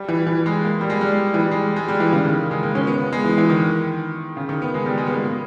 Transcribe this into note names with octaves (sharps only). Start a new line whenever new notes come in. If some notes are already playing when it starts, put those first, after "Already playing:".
Already playing: G3
E3
E3
G#3
A#3
G3
G#3
G3
E3
G3
G#3
G#3
G3
E3
C#3
D#3
G#3
A#3
C#4
B3
B3
G#3
E3
E3
D#3
C#3
D#3
B3
G#3
G3
G#3
B3
A#3
A#3